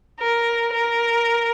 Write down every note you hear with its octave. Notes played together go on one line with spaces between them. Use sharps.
A#4
A#4